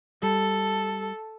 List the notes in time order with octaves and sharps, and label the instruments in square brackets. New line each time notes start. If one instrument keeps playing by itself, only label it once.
[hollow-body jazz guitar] G3 [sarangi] A4